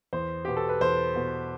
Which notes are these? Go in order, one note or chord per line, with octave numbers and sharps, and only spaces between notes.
E2 C5
B2 B3 G4
A4
B4
E2 C5
B2 B3